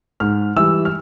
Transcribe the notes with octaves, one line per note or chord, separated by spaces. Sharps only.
G#2 F6
E3 G3 E6
F6